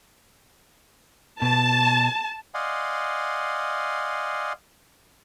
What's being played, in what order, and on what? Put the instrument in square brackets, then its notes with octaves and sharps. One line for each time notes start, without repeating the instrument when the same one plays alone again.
[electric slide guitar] B2 [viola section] A5
[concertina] D5 D#5 F5 F#5 G#5 C6